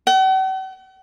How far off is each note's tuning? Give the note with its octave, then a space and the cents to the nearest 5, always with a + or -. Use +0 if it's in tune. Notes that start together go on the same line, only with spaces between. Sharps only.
F#5 +45